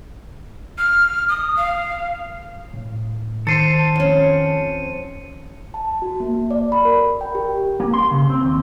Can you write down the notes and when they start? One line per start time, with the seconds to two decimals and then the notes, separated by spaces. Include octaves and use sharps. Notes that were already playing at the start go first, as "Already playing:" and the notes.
0.78 F6
1.29 D#6
1.56 F5
2.74 A2
3.47 D#3 A4 C5 C#7 D#7
3.95 F2 C#4
5.74 A5
6.02 F#4
6.20 A#3
6.51 D5
6.72 B5
6.85 A#4
7.21 G5
7.35 G4
7.80 A#3
7.94 C6
8.11 C#3
8.30 C4
8.44 D#2